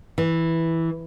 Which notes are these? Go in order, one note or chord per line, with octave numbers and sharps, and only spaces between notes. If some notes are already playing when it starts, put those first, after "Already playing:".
E3